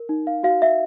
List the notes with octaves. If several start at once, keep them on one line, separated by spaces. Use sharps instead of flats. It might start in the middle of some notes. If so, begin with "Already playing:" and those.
Already playing: A#4
D#4
F5
F#4 F5
E5